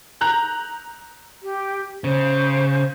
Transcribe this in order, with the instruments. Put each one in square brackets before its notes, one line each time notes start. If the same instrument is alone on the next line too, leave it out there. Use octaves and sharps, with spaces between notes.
[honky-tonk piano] A#5 F#6 G6
[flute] G4
[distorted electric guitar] C#3 [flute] C5